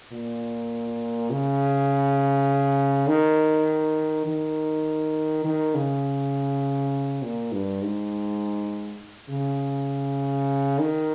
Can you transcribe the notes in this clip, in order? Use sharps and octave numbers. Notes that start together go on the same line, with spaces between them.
A#2
C#3
D#3
D#3
D#3
C#3
A#2
G2
G#2
C#3
D#3